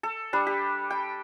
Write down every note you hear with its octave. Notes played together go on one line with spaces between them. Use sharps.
A4
G3 D4
G4
G5